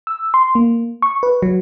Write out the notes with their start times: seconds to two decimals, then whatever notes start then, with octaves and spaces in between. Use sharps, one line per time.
0.07 E6
0.34 C6
0.55 A#3
1.02 C#6
1.23 B4
1.42 F#3